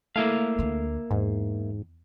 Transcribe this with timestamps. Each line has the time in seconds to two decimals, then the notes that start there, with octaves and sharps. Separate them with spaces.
0.16 A3 A#3 E4 F5
0.58 D2 D3
1.11 E2 G#2